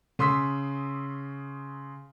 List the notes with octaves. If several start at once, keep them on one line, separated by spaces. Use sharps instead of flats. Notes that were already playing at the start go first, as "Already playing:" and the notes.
C#3 C6 D#6 E6 B6